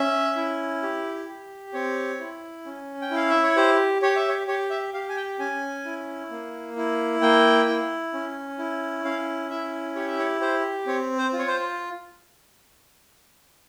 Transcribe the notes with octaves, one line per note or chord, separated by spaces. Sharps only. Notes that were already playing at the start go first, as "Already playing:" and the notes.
Already playing: C#4 E5
E4
G4
G4
C4 C#5
E4
C#4
G5
E4 F5
E5
C#5
G4 C5
G4 C#5
E5
C#5
G4 C#5
E5
G4 F5
G#5
G5
C#4 G#5
E4
A#3
E4
A#3 G5
E4
C#4
E4
C#4 F5
E4 E5
G4 C#5
E5
C#5
G4 C5
C4 C#5
C5
F4
C#5
C5